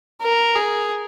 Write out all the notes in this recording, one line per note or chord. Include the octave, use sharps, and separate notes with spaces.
A#4
G#4